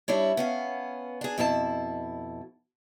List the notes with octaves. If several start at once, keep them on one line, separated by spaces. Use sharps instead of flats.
G3 D4 E4 C#5
B3 C#4 F5
D4 G#4
F2 B2 E4 G#4 A5